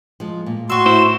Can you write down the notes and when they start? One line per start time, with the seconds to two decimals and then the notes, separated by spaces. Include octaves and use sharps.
0.20 F3 G#3
0.46 A#2
0.70 A2 F#4 C6 C#6 E6
0.86 E4 C5